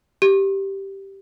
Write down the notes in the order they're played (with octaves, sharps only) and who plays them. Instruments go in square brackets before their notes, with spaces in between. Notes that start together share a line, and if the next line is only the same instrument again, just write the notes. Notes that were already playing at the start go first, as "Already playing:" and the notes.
[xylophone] G4